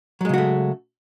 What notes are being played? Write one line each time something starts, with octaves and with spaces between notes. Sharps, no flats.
C#3 F#3 G#3 A3 F#4